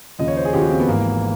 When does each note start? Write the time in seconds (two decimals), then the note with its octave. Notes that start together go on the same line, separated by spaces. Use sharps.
0.19 D#2 C#3 F3 D#5
0.28 C#5
0.37 C5
0.45 G#4
0.53 D#2 C#3 F3 G4
0.62 F#4
0.70 C4
0.80 B3
0.88 G#1 G#2 E3 A#3